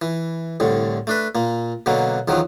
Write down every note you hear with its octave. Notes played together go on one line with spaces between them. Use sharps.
E3
C2 A2 D3
A3 D4 B4
A#2 A#3
B2 D3 F#3 A#3
E2 D#3 F3 F#3